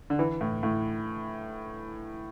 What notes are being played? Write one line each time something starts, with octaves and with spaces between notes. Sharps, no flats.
D3
E3
A2
A2